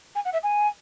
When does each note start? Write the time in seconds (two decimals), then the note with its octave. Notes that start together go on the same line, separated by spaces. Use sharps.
0.15 G#5
0.25 F#5
0.33 E5
0.43 G#5